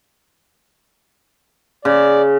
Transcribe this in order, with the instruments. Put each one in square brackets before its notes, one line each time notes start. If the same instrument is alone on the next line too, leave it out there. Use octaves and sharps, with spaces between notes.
[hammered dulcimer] C#3 [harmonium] D5